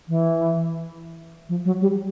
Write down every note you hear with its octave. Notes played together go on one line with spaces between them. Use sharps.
E3
F3
F#3
G3